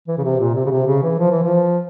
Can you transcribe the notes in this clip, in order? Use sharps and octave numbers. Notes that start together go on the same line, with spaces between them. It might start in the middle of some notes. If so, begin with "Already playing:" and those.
E3
C#3
C3
A#2
C3
C#3
C3
C#3
E3
F3
E3
F3